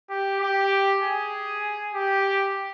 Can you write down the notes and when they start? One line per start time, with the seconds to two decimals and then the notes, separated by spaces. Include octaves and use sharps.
0.10 G4
0.41 G4
1.02 G#4
1.94 G4